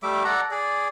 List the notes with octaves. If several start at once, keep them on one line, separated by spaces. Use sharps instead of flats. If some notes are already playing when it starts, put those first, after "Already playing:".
G3 A3 E5 D6
A4 D5 F#5 A#5
G#4 D5